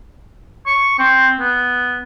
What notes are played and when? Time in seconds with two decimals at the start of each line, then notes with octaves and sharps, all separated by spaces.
0.66 C#6
0.99 C4
1.39 B3